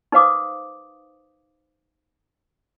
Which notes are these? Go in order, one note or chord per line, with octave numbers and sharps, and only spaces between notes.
D#4 B4 C5 F5 D6 D#6